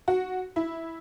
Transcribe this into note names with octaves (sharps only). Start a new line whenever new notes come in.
F#4
E4